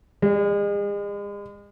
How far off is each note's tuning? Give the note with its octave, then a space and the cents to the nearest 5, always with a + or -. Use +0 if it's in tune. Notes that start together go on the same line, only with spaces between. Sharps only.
G#3 -40 D5 +0